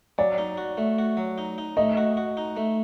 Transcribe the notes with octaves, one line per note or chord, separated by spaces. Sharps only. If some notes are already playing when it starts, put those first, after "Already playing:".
F#3 D5
D#4
F#4
A3
F#4
F#3
D#4
D#4
A3 D#5
F#4
F#4
D#4
A3